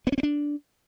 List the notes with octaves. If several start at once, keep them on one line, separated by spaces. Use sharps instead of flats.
B3
C#4
C4
D4